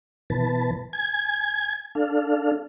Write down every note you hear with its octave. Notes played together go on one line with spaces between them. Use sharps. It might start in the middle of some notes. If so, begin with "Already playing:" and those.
B2 E3 B4 A5
G#5 G#6
D4 A4 F5